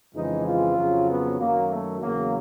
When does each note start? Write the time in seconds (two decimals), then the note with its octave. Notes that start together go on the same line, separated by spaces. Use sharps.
0.14 F2 C#3 E3 G#3 D#4
0.46 F4
0.76 F2 C#3 F#3
1.08 B3
1.38 F#2 D#3 F#3 A#3
1.69 A3
2.01 E2 C#3 F#3 A#3